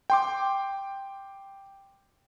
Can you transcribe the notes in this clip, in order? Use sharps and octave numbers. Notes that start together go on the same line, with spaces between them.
G5 C6 D6